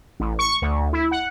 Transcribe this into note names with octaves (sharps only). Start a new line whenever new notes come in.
A1
C#6
D2
E4
F#5